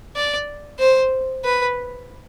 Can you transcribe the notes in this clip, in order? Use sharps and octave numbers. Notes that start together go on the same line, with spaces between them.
D5
C5
B4